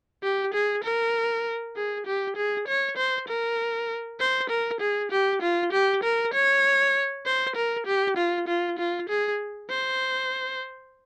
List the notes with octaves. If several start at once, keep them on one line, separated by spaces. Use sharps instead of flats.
G4
G#4
A#4
G#4
G4
G#4
C#5
C5
A#4
C5
A#4
G#4
G4
F4
G4
A#4
C#5
C5
A#4
G4
F4
F4
F4
G#4
C5